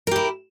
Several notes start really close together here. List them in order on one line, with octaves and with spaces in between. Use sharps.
A#4 G4 E4